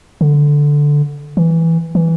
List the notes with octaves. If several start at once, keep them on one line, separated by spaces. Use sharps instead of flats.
D3
E3
E3